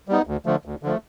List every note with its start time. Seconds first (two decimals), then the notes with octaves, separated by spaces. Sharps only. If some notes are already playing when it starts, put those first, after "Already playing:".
0.08 G3 B3 D#4
0.27 D2
0.46 D3 F3 A3
0.65 D2
0.83 D3 F3 A3